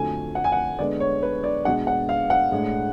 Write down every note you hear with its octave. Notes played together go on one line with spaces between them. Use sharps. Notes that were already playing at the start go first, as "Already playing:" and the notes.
Already playing: F2 D3 F#3 A3 G#5
F#5
G#5
F#5
D3 G#3 B3 D4 D5
C#5
B4
D5
B2 G#3 D4 F#5
F#5
F5
F#5
A2 G#3 D4